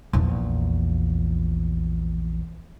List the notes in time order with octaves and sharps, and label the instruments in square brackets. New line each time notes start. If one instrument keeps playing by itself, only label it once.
[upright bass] A#1 E2